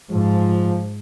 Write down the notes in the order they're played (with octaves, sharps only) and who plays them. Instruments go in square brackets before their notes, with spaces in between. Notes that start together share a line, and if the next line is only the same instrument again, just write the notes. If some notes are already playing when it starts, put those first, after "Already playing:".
[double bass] G#2 [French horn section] F3